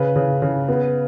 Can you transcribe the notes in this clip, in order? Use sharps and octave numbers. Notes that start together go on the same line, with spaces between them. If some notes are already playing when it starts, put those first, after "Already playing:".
Already playing: C#3 B4
C#3
C#3
B3